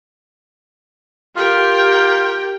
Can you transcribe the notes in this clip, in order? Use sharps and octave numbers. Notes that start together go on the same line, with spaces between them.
F4 G4 A#4 G5